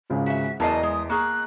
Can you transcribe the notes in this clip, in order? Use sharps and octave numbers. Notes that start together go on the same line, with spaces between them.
G#1 C#2 C#3
F#4 E5 B6
E2 F#3 A#4 D#5 A5 C7
G#3 D#6
A#3 G#4 C#6 F#6